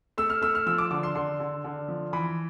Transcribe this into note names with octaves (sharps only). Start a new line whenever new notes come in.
A3 E6
F6
A3 E6
F6
F3 E6
D6
D3 D6
C6
D3 C6
D3
D3
F3
E3 B5